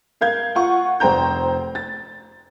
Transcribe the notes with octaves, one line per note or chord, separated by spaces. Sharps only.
A#4 F5 G6 G#6
F4 F#5 C#6
F1 C5 G5 A#5 G6
A6